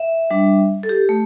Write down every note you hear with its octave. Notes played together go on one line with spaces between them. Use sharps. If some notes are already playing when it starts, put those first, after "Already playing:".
Already playing: E5
G3 D4
A4
G4
A3